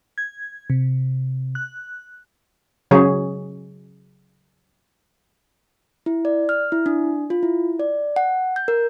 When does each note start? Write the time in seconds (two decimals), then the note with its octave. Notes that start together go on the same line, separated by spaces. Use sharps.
0.18 G#6
0.70 C3
1.55 F#6
2.91 C#3 F#3 G#4 C#5
6.06 E4
6.25 D5
6.49 F6
6.72 E4
6.86 D4
7.30 F4
7.43 E4
7.80 D5
8.16 F#5
8.56 G6
8.68 A#4